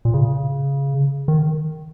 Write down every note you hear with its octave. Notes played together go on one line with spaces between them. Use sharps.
A#2
C#3
D#3